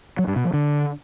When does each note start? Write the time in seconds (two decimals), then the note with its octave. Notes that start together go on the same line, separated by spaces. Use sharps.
0.19 F#3
0.27 G2
0.36 B2
0.45 F3
0.53 D3